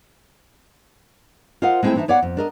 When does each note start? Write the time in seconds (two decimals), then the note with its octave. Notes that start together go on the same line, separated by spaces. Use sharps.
1.62 F4 A#4 C5 D#5 F5 F#5
1.83 G#3 A3 C4 E4 C5 G5
1.96 E3 D4 D#4 C5 E5
2.08 B3 C#5 D5 F5 F#5
2.23 F2
2.37 D4 A#4 D#5